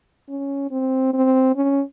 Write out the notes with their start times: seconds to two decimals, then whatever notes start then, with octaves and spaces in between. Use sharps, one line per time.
0.29 C#4
0.71 C4
1.14 C4
1.56 C#4